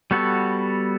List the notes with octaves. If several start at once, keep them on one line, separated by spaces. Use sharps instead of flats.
G3 B3 F#4 A4